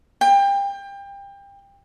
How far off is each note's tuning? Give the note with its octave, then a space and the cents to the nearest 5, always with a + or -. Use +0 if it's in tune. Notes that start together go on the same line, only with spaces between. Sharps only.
G5 +25